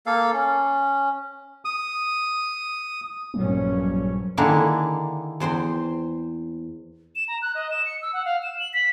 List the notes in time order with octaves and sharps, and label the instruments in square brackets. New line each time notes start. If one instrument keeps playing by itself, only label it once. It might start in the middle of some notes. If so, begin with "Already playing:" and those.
[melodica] A#3 A4 F5
C#4
[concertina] D#6
[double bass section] A#1 G2 C#4 [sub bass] F#3
[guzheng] D3 D#3 A#3 D4 E4 G#4
E2 C5 G5 C6
[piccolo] E7
A#5
F#6
D#5
E7
C#7
E6
F#5
F5
E7
F#7
B6